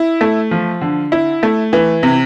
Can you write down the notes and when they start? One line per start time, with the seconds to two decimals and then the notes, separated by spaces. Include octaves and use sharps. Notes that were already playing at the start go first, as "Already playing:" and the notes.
Already playing: E4
0.21 A3
0.51 F3
0.81 D3
1.12 E4
1.43 A3
1.73 E3
2.03 C3